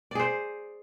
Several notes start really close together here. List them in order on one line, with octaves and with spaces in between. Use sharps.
D5 G#4 C5